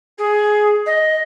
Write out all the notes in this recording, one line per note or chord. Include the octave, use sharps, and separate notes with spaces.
G#4
D#5